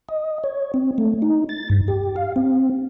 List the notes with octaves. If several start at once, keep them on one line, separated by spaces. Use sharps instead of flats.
D#5
C#5
C4
A3
D#4
A6
G2
G4
F5
C4